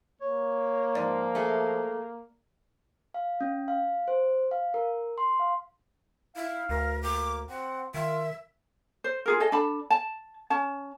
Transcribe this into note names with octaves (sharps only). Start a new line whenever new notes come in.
A#3 C#5
G#2 F3 D5
A3 G#4
F5
C#4
F5
C5
F5
A#4
C6
F5
E4 F5
D2 A#4
A#3 D6
C4 F#5
D#3 F4 E5
C5
F4 G#4 A#4
G#4 A4 D#5
D4 A4 A5 B5
A5
C#4 A5